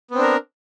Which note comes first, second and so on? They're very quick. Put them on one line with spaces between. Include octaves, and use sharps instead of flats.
B3 C4 D4 A#4